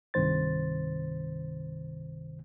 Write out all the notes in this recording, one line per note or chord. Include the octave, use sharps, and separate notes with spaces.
C2 G2 C3 D#3 C5 A6